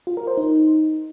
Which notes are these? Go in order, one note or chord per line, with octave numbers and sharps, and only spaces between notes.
F4
A#4
C5
D#4